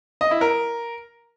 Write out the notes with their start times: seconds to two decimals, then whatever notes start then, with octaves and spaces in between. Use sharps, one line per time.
0.21 D#5
0.31 E4
0.41 A#4